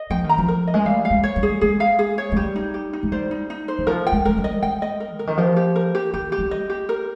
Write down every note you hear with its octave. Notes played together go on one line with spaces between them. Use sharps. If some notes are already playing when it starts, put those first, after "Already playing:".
Already playing: D#5
F3 G5
D#3
A#5
F3
A#4
D#5
G#3
G3 F5
F5
G#3
C#5
G3
G#4
G#3 G#4
F5
G#4
C#5
G#3
G3 G4
D#4
G4
D#4
G#3
G3 C5
D#4
D#4
C5
D#3
F3 A#4
G5
G#3
G#3 A#4
G3
D#5
G#3 G5
D#5
A#4
C#3 A#4
D#3
F3 G4
G4
A#4
G4
D#3 G4
G4
G3
D#5
G4
A#4